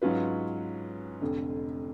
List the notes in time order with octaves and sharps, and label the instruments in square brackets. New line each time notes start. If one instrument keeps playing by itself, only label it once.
[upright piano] G#2 F#3 C#4 F4 B4
F1 F2 D3